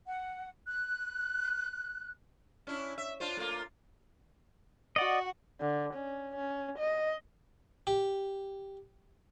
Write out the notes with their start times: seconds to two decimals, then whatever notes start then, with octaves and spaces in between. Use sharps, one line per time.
0.06 F#5
0.67 F#6
2.67 C#4 D4 E4
2.98 E5
3.20 D4 F4 C5
3.37 A3 A#3 F4
4.96 F#4 D5 D#5 F#5
5.61 D3
5.94 C#4
6.36 C#4
6.78 D#5
7.87 G4